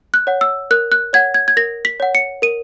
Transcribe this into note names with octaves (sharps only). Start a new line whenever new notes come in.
F#6
C#5 F#5
E6
A#4 F#6
F#6
C#5 F#5 G#6
G#6
G#6
A#4 A#6
B6
C#5 F#5
C#7
A#4 D#7